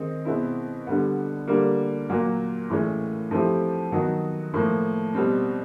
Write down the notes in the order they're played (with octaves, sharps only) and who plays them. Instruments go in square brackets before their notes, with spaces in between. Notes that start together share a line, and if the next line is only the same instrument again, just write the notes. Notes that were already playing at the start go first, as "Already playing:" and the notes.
Already playing: [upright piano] D#3 G#3 C4 D#4
B2 G#3 C4 E4
D3 G3 B3
D3 G3 A#3
A#2 F#3 A#3
A2 E3 G#3 C#4
F3 A3 C4 E4 G4
D#3 F#3 B3 D#4 F#4
A2 F3 A#3
B2 G3 C4